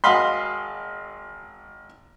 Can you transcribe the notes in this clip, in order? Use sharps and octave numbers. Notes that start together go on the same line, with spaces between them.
G#1 F#4 D#5 F5 B5 C6